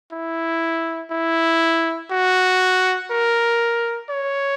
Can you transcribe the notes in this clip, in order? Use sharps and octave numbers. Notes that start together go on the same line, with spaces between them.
E4
E4
F#4
A#4
C#5